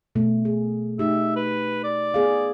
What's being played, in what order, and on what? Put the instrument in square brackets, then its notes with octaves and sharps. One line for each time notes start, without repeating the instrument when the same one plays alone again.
[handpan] B2 A3
G#4
[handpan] A3 D#4 G4 [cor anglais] E5
[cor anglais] B4
D5
[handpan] B3 G#4 F5